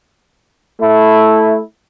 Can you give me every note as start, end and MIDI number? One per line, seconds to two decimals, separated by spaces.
0.81 1.60 57
0.81 1.60 64